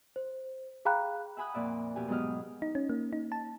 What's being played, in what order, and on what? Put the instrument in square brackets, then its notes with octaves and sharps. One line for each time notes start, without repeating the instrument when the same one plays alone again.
[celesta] C5
G#4 F5 G5 A#5 B5 F#6
[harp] E5 F#5 G#5 B5 D#6 F#6
F2 A#2 D5 E5
F2 B2 G4 G#5
G#2 F#3 B3 G4 D#5 F6
[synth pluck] D#4
C#4
A#3
D#4
A5